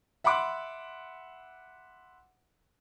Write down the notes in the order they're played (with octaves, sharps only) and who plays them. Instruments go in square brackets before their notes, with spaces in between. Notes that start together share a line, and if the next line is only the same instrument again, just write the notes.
[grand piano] E5 F#5 B5 C6 D6 F#6